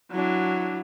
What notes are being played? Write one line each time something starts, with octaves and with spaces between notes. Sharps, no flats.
F#3 D4 E4